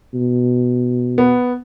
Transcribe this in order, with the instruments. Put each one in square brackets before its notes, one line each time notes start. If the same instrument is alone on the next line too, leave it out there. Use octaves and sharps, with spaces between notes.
[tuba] B2
[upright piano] B3